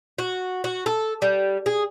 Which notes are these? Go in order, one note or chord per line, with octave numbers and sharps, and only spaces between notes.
F#4
F#4
A4
G3
G#4